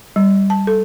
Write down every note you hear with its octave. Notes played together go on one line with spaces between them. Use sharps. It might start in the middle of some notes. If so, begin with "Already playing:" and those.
G3
A5
A4